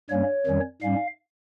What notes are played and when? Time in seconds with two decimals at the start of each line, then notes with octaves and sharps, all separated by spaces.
0.10 G2 G3 A#3 C#4 C#5
0.46 F2 D#3 G3 C#4
0.82 G#2 G3 C#4 F5